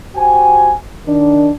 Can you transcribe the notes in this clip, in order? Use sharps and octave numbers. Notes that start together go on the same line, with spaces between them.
F#4 G4 C5 G5 G#5
D#3 D4